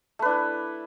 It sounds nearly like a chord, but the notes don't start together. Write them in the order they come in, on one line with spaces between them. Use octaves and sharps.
A3 B4 D4 E4